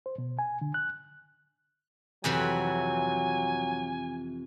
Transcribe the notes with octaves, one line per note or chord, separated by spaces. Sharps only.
C5
B2
G#5
D3
F#6
F2 C3 E3 F#3 G#5